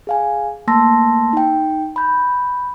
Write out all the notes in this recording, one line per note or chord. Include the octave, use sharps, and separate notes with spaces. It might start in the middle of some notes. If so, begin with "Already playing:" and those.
G#4 F5 G#5
A3 A#3 A5 C6 E6 A#6
D#4 G5
B5 G6